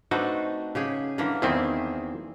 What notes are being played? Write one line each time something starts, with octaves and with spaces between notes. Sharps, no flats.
A3 C4 D4 D#4 F#4 B4
C#3 G4 G#4
D3 E3 A#3
E2 D#3 C4 E4 G#4